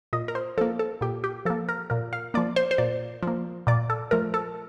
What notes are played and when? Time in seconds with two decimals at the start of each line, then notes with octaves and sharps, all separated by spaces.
0.13 A#2 D#5
0.28 A#4
0.35 C5
0.58 F3 A#3 A4
0.79 A4
1.01 A#2 G4
1.24 G4
1.45 F3 A#3 A4
1.69 A#4
1.90 A#2 A#4
2.13 F5
2.34 F3 A#3 D5
2.56 C5
2.71 C5
2.78 A#2 D5
3.23 F3 A#3
3.67 A#2 D5
3.90 A4
4.11 F3 A3 A#4
4.34 A4